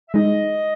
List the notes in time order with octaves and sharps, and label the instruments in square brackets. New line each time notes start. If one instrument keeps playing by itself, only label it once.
[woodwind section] E5
[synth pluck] G#3 D#4 G#4 [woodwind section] D#5